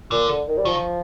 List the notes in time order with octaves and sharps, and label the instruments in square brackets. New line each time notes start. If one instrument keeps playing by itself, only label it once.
[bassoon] A#2 [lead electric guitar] D3
[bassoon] D3
D#3
G3
[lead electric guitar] D#3 [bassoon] F3